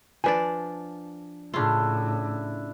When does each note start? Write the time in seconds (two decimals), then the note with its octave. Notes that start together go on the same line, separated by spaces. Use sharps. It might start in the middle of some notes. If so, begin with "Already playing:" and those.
0.24 F3 D4 B4 D5 G#5
1.54 A2 C#3 D4 E4 F4